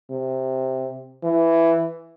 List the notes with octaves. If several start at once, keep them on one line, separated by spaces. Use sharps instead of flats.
C3
E3